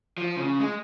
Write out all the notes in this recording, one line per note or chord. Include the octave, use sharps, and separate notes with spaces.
F3
C#3
G#3